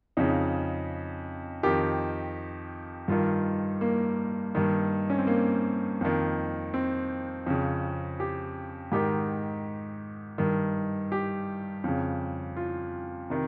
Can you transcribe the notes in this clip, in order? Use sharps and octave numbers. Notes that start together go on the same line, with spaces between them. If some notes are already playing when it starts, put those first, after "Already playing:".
F2 C#3 D#4
F2 D#3 G4
G2 D#3 F4
A#3
G2 D#3
C#4
C4
A#3
F2 D#3
C4
F2 C#3
G4
G#2 D#3 G4
G2 D#3
G4
F2 C#3
F4
C3 D#3